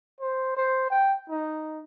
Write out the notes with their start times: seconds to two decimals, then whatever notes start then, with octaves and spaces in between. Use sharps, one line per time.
0.21 C5
0.57 C5
0.91 G5
1.30 D#4